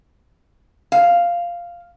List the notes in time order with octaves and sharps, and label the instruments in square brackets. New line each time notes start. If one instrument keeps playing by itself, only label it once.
[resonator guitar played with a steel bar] F5